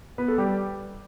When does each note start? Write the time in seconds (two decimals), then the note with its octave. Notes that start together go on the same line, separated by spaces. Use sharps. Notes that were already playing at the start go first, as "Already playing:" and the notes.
0.18 B3 B4
0.28 A4
0.38 G3 G4